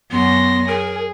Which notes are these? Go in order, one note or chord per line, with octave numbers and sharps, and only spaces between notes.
F#2 B3 C6 A#6
G#4 A#4